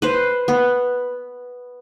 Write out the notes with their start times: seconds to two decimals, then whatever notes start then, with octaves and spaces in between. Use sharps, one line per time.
0.02 B4 C5
0.48 B3